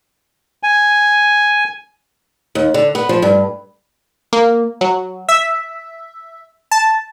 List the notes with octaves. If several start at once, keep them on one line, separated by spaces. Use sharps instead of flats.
G#5
D#2
D3
B3
F3
G2
A#3
F#3
E5
A5